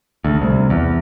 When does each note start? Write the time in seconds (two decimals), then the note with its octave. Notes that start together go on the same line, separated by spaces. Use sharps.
0.25 D2
0.42 C2
0.70 E2